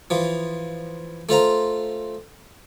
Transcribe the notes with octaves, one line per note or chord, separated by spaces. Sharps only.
E3 F3
A3 F4 C5 A#5